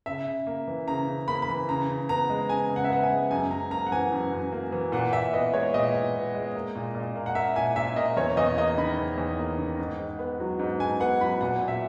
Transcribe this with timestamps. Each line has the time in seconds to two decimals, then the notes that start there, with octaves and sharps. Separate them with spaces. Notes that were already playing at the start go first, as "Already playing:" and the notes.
0.06 C#3 E5
0.27 C#3
0.47 A#3
0.68 E3
0.88 C#3 A#5
1.08 C#3
1.28 A#3 B5
1.42 B5
1.49 E3
1.68 C#3 A#5
1.89 C#3
2.09 B3 A#5
2.30 G#3
2.49 C#3 G#5
2.70 C#3
2.76 F#5
2.84 E5
2.90 B3 F#5
3.03 G#5
3.10 G#3
3.31 F#2 G#5
3.50 F#2 A#5
3.71 A#3 A#5
3.87 F#5
3.92 E3 G#5
4.12 F#2
4.32 F#2
4.52 A#3
4.72 E3
4.92 A#2 F#5
5.13 A#2 E5
5.33 B3 D#5
5.54 G#3 C#5
5.74 A#2 D#5
5.94 A#2
6.14 B3
6.35 G#3
6.55 A#3
6.75 A#2
6.95 A#2
7.15 A#3
7.26 F#5
7.35 A#3 E5
7.56 A#2 G#5
7.76 A#2 E5
7.96 A#3 D#5
8.17 E2 C#5
8.37 E2 D#5
8.58 A#3 D#5
8.77 D#3 B5
8.98 E2
9.18 E2
9.38 A#3
9.58 D#3
9.79 G#2
9.99 G#2
10.19 B3
10.40 F#3
10.59 G#2
10.80 G#2 G#5
11.00 B3 F#5
11.21 F#3 B5
11.41 A#2 F#5
11.61 A#2
11.68 E5